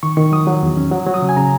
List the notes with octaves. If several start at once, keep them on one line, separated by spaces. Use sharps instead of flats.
D#3 C#6
D#3 C#6
F#3 D#6
F#3
E2
C#4
F#3
F#3
D#6
C#3
G#5
C#3 A#5